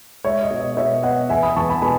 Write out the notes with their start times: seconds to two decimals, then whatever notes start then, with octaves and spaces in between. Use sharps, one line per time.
0.24 G#3 C#5 E5
0.43 D#5
0.51 B2
0.60 D#5
0.77 B2 C#5 E5
1.03 B3 D#5 F#5
1.29 E2 E5 G#5
1.42 B5 D#6
1.56 E2 A5 C#6
1.69 G#5 B5
1.82 B2 G#5 B5